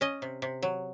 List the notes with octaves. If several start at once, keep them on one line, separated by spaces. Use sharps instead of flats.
C#4 D#5
C3
C3
F#3